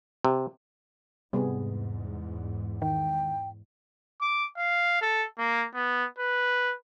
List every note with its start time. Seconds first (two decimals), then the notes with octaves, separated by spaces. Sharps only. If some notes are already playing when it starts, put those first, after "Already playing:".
0.25 C3
1.33 E2 G#2 C3 G3 B3 G#4
2.82 D#3 G5
4.21 D6
4.58 F5
5.02 A4
5.38 A#3
5.74 B3
6.18 B4